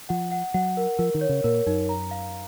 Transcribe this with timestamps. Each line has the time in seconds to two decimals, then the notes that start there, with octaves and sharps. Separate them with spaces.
0.09 F3 F#5
0.32 F#5
0.54 F#3 F#5
0.77 A#4
0.99 F3 A#4
1.14 D#3
1.21 C#5
1.29 C#3
1.44 A#2 A#4
1.66 F#2 D#4
1.89 A#5
2.11 F5